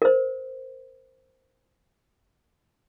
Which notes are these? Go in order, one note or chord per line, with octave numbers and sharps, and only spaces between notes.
A#4 C5